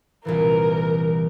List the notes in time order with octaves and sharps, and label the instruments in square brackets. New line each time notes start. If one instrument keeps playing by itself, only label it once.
[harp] C2 A#2 E3 [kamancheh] A#4